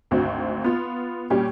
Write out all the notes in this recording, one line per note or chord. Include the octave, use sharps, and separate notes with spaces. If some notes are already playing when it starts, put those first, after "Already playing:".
G#1 D2 C4 F#4
B3 F4
A#2 G3 C#4 G4